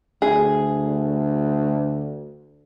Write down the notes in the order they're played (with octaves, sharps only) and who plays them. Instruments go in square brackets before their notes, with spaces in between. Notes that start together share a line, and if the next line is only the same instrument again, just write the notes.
[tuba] D2 [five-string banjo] G#4